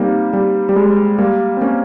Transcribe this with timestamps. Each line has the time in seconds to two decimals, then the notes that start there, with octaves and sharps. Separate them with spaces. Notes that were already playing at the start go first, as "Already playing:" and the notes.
Already playing: G3 A#3 C4 D#4
0.33 G3
0.69 G3
0.76 G#3
1.18 G3 A#3
1.57 C4
1.61 A#3 C#4